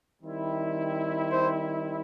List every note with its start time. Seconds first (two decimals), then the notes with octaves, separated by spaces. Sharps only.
0.22 D#3 G3 C4 E4
1.32 C5